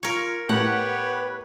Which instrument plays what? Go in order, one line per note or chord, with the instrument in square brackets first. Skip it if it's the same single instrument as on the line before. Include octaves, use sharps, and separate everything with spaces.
[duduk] F4 [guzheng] A#4 C#5
[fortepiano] A2 [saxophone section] B3 G4 C#5 [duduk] B4 [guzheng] F#5